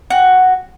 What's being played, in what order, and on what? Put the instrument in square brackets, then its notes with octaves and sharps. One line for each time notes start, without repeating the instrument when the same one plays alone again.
[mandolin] F#4